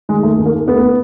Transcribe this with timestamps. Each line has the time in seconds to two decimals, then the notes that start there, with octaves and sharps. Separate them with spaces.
0.09 D#3 G#3
0.23 D#2 A3
0.38 D#3
0.46 A#3
0.53 D#2
0.68 D2 B3